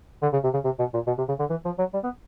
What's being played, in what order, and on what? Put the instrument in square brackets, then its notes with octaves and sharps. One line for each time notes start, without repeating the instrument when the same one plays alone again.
[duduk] D3
C#3
C3
C#3
C3
B2
A#2
B2
C3
C#3
D3
E3
F3
F#3
G3
B3